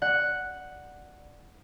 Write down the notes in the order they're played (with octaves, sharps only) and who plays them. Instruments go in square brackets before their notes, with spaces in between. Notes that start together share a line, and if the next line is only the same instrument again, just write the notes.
[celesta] D5 [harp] F#5